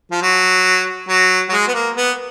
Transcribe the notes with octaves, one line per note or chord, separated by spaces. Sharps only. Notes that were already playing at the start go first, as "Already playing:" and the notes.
F3
F#3
F#3
F#3
G#3
B3
A#3
B3